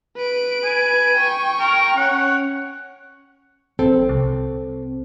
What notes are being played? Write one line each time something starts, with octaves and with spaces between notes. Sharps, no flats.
B4 D7
G#5
G5 C#6
A#4
C#4 C#5 F#5
A#1 C4 A4
C2